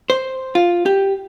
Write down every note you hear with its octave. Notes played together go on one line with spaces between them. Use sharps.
C5
F4
G4